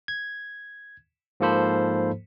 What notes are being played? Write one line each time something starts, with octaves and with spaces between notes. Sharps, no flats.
G#6
G#2 F3 A#3 A4 C5 B5